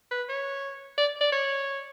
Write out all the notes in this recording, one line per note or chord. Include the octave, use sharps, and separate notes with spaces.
B4
C#5
D5
D5
C#5